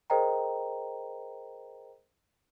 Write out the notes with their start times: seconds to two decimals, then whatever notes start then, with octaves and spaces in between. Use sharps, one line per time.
0.10 G#4 A#4 C5 D#5 G5 A#5